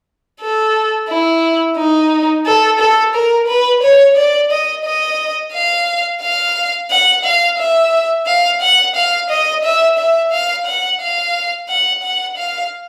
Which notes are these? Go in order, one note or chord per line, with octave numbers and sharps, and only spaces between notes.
A4
E4
D#4
A4
A4
A#4
B4
C#5
D5
D#5
D#5
F5
F5
F#5
F5
E5
F5
F#5
F5
D#5
E5
E5
F5
F#5
F5
F#5
F#5
F5